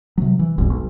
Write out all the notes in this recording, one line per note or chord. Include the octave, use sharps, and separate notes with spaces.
C3 F#3
E3
F1 C#2 G#2 B2
B1